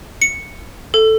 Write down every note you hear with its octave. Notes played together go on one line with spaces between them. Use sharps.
C#7
A4